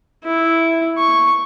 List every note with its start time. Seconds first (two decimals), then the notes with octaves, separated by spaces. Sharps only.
0.24 E4
0.98 C#6